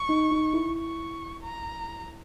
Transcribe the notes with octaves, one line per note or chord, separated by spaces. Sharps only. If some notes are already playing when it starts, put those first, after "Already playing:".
Already playing: C#6
D#4
D#4
E4
C#6
A#5